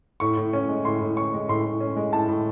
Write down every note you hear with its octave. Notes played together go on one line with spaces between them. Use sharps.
A2 C#6
A2
C#4
G#3
A2 C6
A2
C#4 C#6
G#3
A2 C6
A2
C#4
G#3
A2 A5
A2